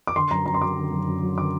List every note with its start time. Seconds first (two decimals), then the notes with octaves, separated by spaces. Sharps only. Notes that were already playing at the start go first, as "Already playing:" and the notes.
0.07 D6
0.16 D3 C6
0.31 F#2 A#5
0.46 F#2 A#5
0.54 C6
0.61 F#3 D6
0.77 D3
0.92 F#2
1.07 F#2
1.22 F#3
1.38 D3 D6